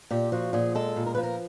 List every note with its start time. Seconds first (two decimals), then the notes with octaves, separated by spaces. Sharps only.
0.11 A#2 G4
0.32 F3 F#4
0.53 A#2 G#4
0.75 G#3 A4
0.96 A#2
1.06 A#4
1.15 F3 B4
1.23 A#4